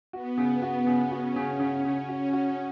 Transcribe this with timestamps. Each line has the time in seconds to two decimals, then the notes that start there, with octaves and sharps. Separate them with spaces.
0.13 B3 F#4
0.37 C#3
0.62 F#4
0.87 C#3
1.11 C#4 F#4
1.36 C#3
1.59 C#3
1.85 C#3
2.09 C#4 F#4
2.33 F#4